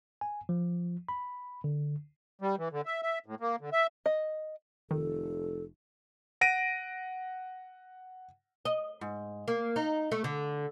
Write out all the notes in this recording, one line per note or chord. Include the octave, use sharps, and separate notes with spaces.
G#5
F3
B5
D3
G3
E3
D3
E5
E5
A2
A#3
D3
E5
D#5
F1 D#3 A4
F#5 A#6 D7 D#7
D#5
G#2
A#3
D#4
A3
D3